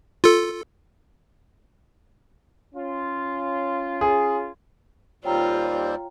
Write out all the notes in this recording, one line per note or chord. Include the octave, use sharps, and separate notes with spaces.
F4 A4
C#4 F4
G#4
D#2 G3 C4 F4 C#5 G5 A#5